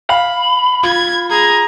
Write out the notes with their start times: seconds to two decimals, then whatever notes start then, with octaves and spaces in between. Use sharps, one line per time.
0.10 F5 B5
0.83 F4 G#6
1.30 G#4 A#5 G#6